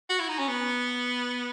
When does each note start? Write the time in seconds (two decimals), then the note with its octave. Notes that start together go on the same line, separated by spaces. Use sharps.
0.10 F#4
0.20 E4
0.29 D#4
0.39 C#4
0.48 B3